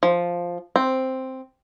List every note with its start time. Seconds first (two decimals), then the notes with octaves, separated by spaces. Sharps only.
0.03 F3
0.76 C4